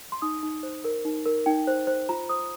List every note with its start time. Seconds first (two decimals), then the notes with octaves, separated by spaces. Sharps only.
0.12 C6
0.22 D#4 D#6
0.43 D#4
0.63 C5
0.84 A#4
1.05 D#4
1.26 A#4
1.46 D#4 G5
1.67 C5
1.87 C5
2.09 F4 A#5
2.29 C5 D#6